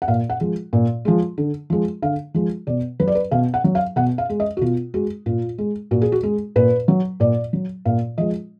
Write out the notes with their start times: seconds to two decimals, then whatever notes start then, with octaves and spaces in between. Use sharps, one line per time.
0.02 F#5
0.08 A#2 F5
0.30 F#5
0.40 F3 G#3
0.73 A#2
1.05 F3 G#3
1.38 D3
1.70 F3 G#3
2.02 D3 F5
2.34 F3 G#3
2.67 B2 D5
3.00 F#3 B4
3.07 D5
3.15 B4
3.31 B2 F5
3.54 F#5
3.64 F#3
3.75 F5
3.96 B2 F#5
4.18 F5
4.29 G#3
4.40 D#5
4.57 F#4
4.61 B2 F4
4.94 G#3 F#4
5.26 A#2 F4
5.58 G#3
5.91 A#2 F#4
6.02 G#4
6.12 F#4
6.23 G#3 G#4
6.56 A#2 B4
6.88 F#3
7.20 A#2 D5
7.53 F#3
7.85 A#2 F5
8.18 F3 G#3 D#5